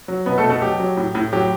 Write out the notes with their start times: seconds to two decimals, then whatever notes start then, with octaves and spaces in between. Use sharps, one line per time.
0.08 F#3
0.26 B2 B3 B4
0.38 A3 A4
0.44 B2
0.50 A3 A4
0.62 F#3 G4
0.80 F#3
0.97 A2
1.15 A2
1.33 F#3 G4